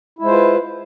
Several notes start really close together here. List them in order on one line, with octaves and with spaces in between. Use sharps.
E4 G#3 C5 F4 B4